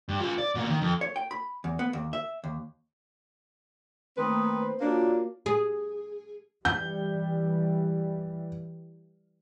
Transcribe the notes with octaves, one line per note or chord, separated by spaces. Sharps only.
G2
F4 G#4
D5
B2 A#3
D#3
F2
C#5
G5
B5
E2
B3
D#2
E5
D#2
D#3 A3 A#3 C4 B4 D#6
C5
A#3 D4 F4 F#4 C#5
G#4
E3 G3 G6